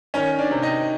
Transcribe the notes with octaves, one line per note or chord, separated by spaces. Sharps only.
D#3 C#4 C#5
D4 D5
C3
D#4 D#5